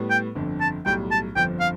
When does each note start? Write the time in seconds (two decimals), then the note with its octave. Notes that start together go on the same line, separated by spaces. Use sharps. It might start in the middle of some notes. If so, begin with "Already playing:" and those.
Already playing: A2 G3 B3
0.10 G5
0.35 G1 F2 D3
0.60 A5
0.86 B1 A2 G3 G5
1.11 A5
1.35 G1 F2 D3 F3 G5
1.60 F5